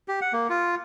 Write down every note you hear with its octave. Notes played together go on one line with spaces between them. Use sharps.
G4
F#5
A#3
F4